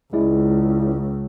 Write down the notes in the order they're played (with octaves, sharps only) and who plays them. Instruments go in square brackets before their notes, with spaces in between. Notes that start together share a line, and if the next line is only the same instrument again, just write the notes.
[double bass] C#2 [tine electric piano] G#3 E4 D5